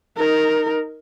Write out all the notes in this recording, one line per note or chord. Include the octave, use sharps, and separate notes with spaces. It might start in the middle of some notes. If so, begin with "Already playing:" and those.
D#4 A#4